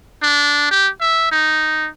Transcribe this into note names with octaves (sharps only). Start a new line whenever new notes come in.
D4
G4
E5
D#4